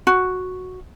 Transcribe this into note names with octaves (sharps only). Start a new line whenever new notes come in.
F#4